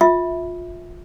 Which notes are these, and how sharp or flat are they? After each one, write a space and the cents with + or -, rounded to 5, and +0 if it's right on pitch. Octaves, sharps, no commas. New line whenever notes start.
F4 +20 E5 -15